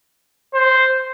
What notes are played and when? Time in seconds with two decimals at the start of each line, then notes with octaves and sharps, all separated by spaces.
0.55 C5